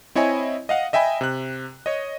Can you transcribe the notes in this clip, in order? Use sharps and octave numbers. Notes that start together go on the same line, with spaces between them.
C4 E4 C#5 D#5 G#5
D#5 F5 F#5
D#5 E5 G5 G#5 B5
C3 F#6
C#5 D#5